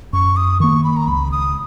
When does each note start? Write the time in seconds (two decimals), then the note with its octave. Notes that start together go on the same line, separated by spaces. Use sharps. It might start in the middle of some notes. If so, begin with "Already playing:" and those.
0.13 F#2 C#6
0.37 D#6
0.60 D#3 A#3 C#6
0.84 B5
0.96 A#5
1.07 C#2 B5
1.32 D#6